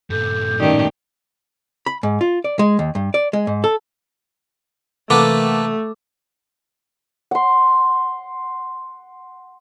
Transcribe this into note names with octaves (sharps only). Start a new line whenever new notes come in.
G2 A#2 A4 D6 G6
A2 D#3 C#4 D#4 G4 D5
B5
G#2
F4
D5
G#3
D#2
G2
D5
G#3
G#2
A4
C3 E3 A3 A#3 A4 B4 F#5 D6
F#5 C6